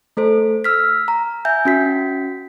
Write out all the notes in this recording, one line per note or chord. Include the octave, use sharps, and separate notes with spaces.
A3 A4 C5
E6 F6 B6
A#5
E5 G#5 G6
C#4 F#4 B6